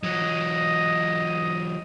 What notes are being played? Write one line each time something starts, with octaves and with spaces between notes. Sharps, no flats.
E3 F#3 D#5